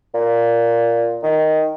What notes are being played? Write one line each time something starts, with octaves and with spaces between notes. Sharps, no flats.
A#2
D#3